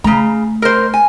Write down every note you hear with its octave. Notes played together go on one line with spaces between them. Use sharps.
C#3 A3 A#5
A#4 C5
G#5